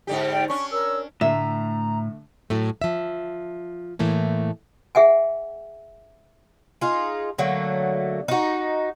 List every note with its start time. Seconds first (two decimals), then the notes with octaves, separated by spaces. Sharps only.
0.07 G#2 D3 G4
0.32 D5 G5
0.50 C#4 D4 C#6
0.71 A#4 C#5 E6
1.21 A2 D3 A3 E5 A#5
2.50 A2 F#3 A3
2.82 F3 E5
3.99 A2 E3 A3 A#3
4.95 G#4 E5 F#5 G#5
6.81 D#4 F4 G#4
7.38 D3 F#3 A3 A#3
8.28 D#4 F#4